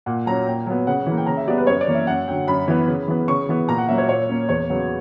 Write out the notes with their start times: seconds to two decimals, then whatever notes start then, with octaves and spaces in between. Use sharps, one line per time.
0.06 A#2 F#5
0.26 F#3 C#4 A#5
0.47 A#2 G5
0.66 F#3 B3
0.87 C#3 F#5
1.06 E3
1.11 A#3
1.17 G5
1.27 C#3 A#5
1.37 E5
1.47 G3 B3 D5
1.58 B4
1.67 F#2 C#5
1.81 D5
1.88 E3 A#3 C#4
1.95 E5
2.07 F#2 F#5
2.28 D3 F#3 G5
2.48 F#2 B5
2.68 E3 B3
2.88 C#3
3.08 E3 B3
3.28 C#3 C#6
3.49 E3 B3
3.68 A#2 A#5
3.78 F#5
3.88 F#3 A#3 C#4 E5
3.98 C#5
4.09 A#2 C#5
4.29 A#3 C#4
4.49 E2 C#5
4.69 C#3 F#3 B3